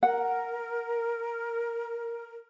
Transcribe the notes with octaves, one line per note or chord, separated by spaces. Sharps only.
A#4 F#5